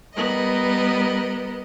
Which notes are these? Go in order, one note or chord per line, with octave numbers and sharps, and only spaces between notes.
G3 B3 A#4 D#5